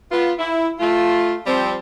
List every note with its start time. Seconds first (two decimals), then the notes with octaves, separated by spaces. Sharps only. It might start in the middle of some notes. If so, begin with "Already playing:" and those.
0.12 B3 F4
0.39 E4
0.80 A3 F4
1.46 F3 G3 C4